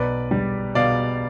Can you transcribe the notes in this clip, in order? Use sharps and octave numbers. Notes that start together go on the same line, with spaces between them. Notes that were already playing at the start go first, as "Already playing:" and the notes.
Already playing: B1 B4 D5
G3
B2 D5 F5